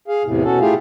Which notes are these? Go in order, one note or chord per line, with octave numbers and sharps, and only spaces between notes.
G#4 F5
E2 A2 C3
B2 C#4 F#4 A4
A3 E4 F4 G4 G#4 F5